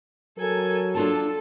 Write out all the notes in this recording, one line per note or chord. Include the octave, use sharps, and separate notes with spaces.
F#3 A4 A#4 G#5
D4 F4 A4 A5